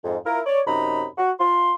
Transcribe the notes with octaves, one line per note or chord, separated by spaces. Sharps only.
F2 G#2
E4 F4 A#4
C#5 D5
F#2 C3 D#4 A#5 B5
F#4
F4 C6